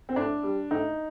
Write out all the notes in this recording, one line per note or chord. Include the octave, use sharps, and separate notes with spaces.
C4
A2 D4
G3
A2 D#4